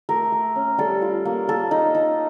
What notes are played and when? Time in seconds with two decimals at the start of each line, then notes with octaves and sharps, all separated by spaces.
0.09 A3 A#4
0.32 A3
0.56 C#4
0.78 G3 A4
1.02 F4
1.25 A#3
1.48 A#3 A4
1.71 D#4
1.95 D#4